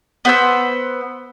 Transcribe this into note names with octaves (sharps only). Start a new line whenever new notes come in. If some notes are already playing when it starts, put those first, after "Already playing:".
B3 C5 E6